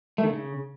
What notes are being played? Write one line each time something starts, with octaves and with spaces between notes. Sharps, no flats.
A3
D#3
C#3